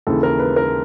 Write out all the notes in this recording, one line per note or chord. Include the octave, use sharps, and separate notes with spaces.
D#2 C#3 E3 A4
A#4
B4
A#4